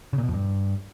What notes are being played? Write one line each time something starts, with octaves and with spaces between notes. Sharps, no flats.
C#3
A#2
B2
F2
G2